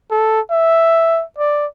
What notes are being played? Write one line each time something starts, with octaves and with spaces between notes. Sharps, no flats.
A4
E5
D5